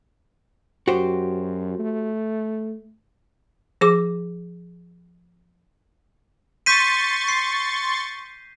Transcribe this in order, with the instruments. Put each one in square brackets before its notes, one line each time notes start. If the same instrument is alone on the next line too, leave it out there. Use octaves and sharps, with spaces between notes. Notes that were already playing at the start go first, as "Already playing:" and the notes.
[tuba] F#2 [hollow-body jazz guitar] F#4 G4 C5
[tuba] A3
[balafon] F3 G#4 D6
[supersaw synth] C6 C#6 A6 [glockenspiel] G6 B6 D#7
[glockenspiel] C7